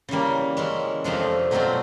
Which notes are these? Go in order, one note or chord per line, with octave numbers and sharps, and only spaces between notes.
C#3 E3 G3 A#3
E3 G#3 C#4
F2 C3 F3 A3 D4
B2 F#3 A3 C4 F4